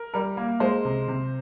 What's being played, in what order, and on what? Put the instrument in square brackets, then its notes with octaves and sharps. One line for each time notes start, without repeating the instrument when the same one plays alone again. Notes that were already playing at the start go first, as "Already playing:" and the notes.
Already playing: [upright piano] A#4
[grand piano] G3 [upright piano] A#4
[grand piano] A#3
[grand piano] G#3 [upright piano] C5
[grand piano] C3
C3